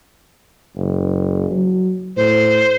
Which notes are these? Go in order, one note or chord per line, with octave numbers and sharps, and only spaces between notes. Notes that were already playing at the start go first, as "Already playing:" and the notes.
F#1
F#3
A2 C5